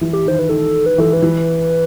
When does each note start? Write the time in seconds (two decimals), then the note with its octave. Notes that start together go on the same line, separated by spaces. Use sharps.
0.01 E3
0.13 G4
0.26 D#3 C5
0.39 B4
0.49 D#3 A4
0.86 B4
0.98 E3 A4
1.13 B4
1.22 E3